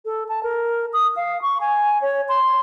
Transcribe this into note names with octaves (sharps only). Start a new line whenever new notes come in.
A4
A5
A#4
D#6
F5
C#6
G#5
C#5
C6